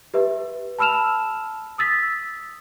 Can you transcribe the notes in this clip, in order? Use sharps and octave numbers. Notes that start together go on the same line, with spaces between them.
G4 B4 E5
A5 B5 E6 F6 E7 F7
D#6 E6 A6 B6